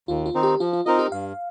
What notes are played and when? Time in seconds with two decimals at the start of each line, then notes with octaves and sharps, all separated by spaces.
0.08 D#2 F4
0.26 F4
0.34 D#3 C4 D#4
0.43 G4
0.60 F3 F4
0.73 F4
0.86 C4 D#4 F4 A#4 D#5
0.99 G4
1.12 G2 F5